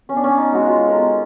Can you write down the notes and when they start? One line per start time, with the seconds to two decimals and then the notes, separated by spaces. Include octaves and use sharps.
0.09 B3 C#4
0.16 D4
0.24 C#4
0.37 D#4
0.52 G#3 F#4
0.67 F4
0.88 A#4
0.95 B3 A4